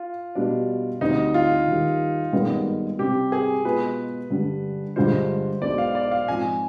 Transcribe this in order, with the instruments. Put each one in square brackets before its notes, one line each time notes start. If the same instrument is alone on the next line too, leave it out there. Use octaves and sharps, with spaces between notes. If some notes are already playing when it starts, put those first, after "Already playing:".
Already playing: [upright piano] F4
[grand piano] B2 G3 D4
[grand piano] D2 D3 G3 C4 [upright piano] D#4
[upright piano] F4
[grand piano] D#2 D#3 G3
G#1 G2 D#3 G#3 B3
[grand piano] C3 G3 C4 [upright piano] G4
[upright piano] G#4
[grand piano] B2 G#3 B3 F4 G#4 [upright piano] B4
[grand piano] G2 D3 G3
[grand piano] G2 D3 G#3 D4 F4 [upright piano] C5
[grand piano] B1 B2 G#3 D4 [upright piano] D5
[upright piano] F5
D5
F5
[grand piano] G#2 F3 C4 F4 [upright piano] G#5